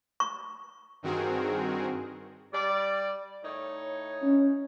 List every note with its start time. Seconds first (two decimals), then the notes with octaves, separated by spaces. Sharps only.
0.20 C#6
1.03 G2 D#3 C4 F#4 G#4 A#4
2.54 G3 D5
3.44 A2 D#4 C#5
4.23 C#4